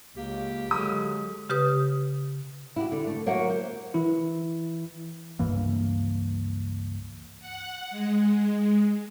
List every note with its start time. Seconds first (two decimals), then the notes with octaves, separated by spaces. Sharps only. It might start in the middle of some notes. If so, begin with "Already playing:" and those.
0.17 C#2 A#3 G4
0.71 D3 F#3 G#3 D#6
1.50 C#3 G4 B4 D#6
2.76 E4 F#4 G4
2.92 D3
3.07 A3
3.26 F#3 A#3 F#4 G4 E5 F#5
3.50 C5
3.94 E3 E4
5.39 C#2 G2 E3 A#3
7.40 F#5
7.90 G#3